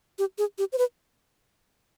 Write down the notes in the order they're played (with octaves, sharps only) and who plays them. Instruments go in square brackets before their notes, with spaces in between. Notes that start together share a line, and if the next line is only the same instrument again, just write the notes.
[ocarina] G4
G#4
G4
C5
B4